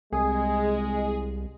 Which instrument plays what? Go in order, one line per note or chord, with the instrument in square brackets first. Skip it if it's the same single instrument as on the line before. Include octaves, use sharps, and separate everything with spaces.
[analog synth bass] C2 [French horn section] G#3 [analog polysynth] G#4 [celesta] G#5 D#6